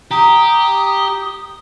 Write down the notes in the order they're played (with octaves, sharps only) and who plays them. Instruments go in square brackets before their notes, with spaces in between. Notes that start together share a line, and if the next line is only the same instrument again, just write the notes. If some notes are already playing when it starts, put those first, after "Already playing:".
[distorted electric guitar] G4 [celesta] A#5 [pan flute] D#6